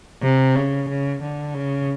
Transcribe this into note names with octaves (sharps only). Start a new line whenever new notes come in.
C3
C#3
C#3
D3
C#3